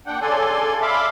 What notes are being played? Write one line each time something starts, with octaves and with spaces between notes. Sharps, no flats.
A#2 D4 F#5 G5
C#3 A4 D5 G#5 C6
E5 F5 B5 C6 D6